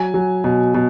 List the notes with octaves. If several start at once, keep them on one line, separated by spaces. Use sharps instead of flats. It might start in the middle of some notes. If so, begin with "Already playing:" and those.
Already playing: F#3 G#5
F#3
B2
B2